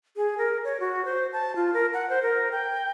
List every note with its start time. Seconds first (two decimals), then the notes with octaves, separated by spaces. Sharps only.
0.16 G#4
0.38 A#4
0.64 C#5
0.80 F#4
1.05 C5
1.33 A5
1.56 F4
1.74 A#4
1.93 F#5
2.10 C5
2.23 A#4
2.52 G5